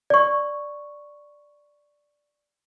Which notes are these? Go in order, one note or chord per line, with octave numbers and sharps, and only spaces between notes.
D5 C#6